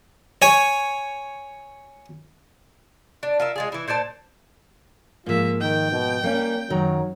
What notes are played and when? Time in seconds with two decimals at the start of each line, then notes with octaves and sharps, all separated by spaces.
0.42 C#5 G#5
3.23 D4
3.40 F4 A#4 E5
3.56 G#3 F4 G#4
3.72 E3 E4
3.88 A#2 C5 D5 A5
5.26 G#2 F3 A#3 F4 E5
5.61 D#3 G5
5.92 B2
6.24 G3 A#3 C#4
6.70 F#2 D#3 F#3 A#5